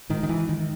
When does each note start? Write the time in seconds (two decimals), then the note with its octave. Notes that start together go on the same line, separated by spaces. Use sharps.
0.10 G#2 D#3
0.23 D#3
0.29 E3
0.49 D#3